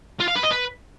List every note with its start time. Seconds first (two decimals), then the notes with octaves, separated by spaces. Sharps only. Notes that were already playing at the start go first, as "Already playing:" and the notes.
0.20 F4
0.28 F5
0.35 B4
0.43 D#5
0.51 B4